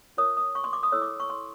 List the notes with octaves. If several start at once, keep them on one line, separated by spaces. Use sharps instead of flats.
F4 A#4 C#5 D#6
D#6
C#6
C6
D6
D#6
E4 A4 C#5 E6
D6
C#6
C6